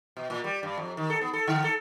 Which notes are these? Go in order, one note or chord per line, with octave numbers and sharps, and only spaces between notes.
B2
A#2
G3
G2
F2
D#3
A4
B3
A4
D3
A4